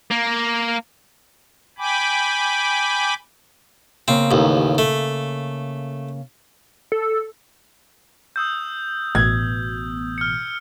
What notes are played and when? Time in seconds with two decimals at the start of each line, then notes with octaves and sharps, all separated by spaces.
0.11 A#3
1.78 G5 G#5 B5 D6
4.08 C#3 A#3 C4
4.31 A1 D#2
4.78 A3
6.92 A4
8.36 D#6 E6 G6
9.15 A1 B2 G#6
10.18 F6 C#7